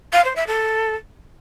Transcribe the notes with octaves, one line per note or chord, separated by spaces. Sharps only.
F5
C5
E5
A4